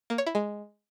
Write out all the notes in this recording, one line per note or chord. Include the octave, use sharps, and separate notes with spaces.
A#3
C#5
E4
G#3